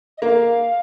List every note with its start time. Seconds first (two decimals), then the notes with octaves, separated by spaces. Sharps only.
0.17 D#5
0.22 A#3 F5